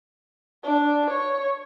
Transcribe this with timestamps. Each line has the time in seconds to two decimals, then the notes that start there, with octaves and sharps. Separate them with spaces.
0.64 D4
1.10 C#5